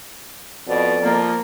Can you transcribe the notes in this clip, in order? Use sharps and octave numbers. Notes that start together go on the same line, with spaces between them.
F2 B2 D5
F3 A#3